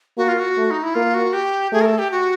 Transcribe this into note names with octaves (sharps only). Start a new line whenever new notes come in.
A#3 F#4
F4
F#4
A3
D#4
E4
A#3 F4
F#4
G4
A3 G#4
A#4
A4
G4
F#4